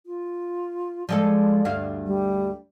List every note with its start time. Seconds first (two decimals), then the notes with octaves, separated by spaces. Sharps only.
0.07 F4
1.09 F3 G#3 A4 D5
1.65 D2 G2 F5
2.06 G3